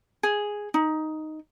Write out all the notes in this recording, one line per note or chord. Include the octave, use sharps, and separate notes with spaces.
G#4
D#4